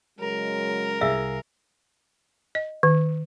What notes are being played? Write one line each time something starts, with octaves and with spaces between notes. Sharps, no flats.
C#3 F#3 G#3 A#4
C2 G#4 E5 F5 G#5 E6
D#5
D#3